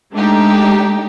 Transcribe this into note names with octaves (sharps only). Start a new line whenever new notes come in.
G#3 A3 D4 D#4 G4